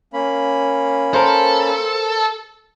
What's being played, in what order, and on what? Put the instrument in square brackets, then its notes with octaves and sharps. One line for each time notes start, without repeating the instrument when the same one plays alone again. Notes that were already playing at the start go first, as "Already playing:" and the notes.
[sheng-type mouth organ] A#3 C#4 B5
[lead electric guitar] A4 [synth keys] A#4 C5